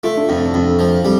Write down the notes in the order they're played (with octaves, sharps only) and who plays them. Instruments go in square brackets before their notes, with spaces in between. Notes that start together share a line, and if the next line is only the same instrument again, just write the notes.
[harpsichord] A3 [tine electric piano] F4
[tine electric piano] D4
[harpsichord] F2 [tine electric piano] C4
[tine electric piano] D4
[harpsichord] F2
F3
G3